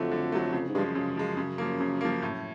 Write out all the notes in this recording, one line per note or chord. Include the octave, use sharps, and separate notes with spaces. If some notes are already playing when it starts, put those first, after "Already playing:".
Already playing: F2 D3 F#3 A3
D3
F#3 A3
F2 C#3
G#2
G2 F3 G#3
F#2
F#2 C#3
F3 G#3
C#3
F3 A#3
C#3
F3 A#3
A2